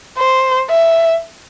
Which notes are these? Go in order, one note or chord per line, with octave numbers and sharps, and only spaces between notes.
C5
E5